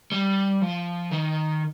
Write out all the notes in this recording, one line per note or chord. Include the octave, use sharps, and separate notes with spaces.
G3
F3
D#3